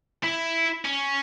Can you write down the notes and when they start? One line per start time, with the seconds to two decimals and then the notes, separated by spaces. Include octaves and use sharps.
0.24 E4
0.85 C#4